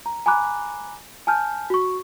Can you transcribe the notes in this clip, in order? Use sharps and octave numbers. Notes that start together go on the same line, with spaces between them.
A#5
G#5 A#5 B5 D6 F#6
G#5 A5 F6 G6
F#4 C#6